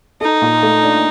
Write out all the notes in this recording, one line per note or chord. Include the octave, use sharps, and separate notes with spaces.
D#4 A4
A#2
A3
D4